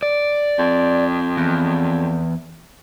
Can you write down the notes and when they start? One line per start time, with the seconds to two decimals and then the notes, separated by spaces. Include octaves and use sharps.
0.03 D5
0.59 F2
1.37 E2